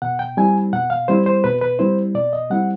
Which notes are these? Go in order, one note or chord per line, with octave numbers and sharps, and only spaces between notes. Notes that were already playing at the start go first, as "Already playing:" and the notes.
B2 F#5
G5
G3 C4 E4 G#5
B2 F#5
F5
G3 C4 E4 C5
C5
B2 B4
B4
G3 C4 E4 C5
B2 D5
D#5
G3 C4 E4 F#5